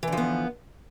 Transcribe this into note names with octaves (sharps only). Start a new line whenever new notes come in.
D3 E3 F3 B3